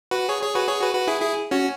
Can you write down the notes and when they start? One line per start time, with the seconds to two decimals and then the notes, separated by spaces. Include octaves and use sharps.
0.11 F#4 B4
0.29 G#4 C#5
0.42 G#4 C#5
0.55 F#4 B4
0.68 G#4 C#5
0.81 F#4 B4
0.94 F#4 B4
1.07 E4 G#4
1.21 E4 G#4
1.51 C#4 F#4